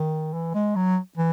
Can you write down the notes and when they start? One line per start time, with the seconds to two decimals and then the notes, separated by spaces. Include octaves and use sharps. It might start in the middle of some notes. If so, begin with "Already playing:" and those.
Already playing: D#3
0.34 E3
0.54 G#3
0.76 F#3
1.18 E3